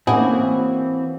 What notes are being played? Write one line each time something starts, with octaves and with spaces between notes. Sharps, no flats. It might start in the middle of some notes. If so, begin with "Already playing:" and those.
E3 A#3 C4 C#4 D#4 E4 F#4 G#4